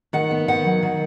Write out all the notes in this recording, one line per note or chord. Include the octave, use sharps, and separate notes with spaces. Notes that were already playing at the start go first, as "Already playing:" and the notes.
D#3 F#5
B3
D#3 F#5
F#3
D#3